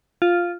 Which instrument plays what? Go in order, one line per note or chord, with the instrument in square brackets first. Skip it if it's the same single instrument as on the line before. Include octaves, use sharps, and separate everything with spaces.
[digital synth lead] F4